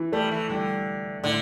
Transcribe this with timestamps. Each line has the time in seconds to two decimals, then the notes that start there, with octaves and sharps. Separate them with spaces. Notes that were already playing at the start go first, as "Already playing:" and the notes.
Already playing: E3
0.12 G3 A3
0.31 E3
0.49 D3 G3
1.23 A2 D3